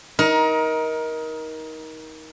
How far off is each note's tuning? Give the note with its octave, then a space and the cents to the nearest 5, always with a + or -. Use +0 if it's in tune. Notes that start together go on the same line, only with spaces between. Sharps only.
D#4 +25 A#4 +20